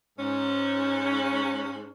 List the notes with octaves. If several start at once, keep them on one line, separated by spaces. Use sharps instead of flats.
G#2 C#4